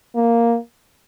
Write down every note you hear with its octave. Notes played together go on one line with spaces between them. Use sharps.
A#3